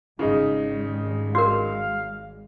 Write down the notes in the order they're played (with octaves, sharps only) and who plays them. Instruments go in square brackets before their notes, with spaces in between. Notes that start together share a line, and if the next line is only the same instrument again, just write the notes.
[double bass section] G#1 G3 G#3 [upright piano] C#3 D#4
[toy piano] F#4 A#4 [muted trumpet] F5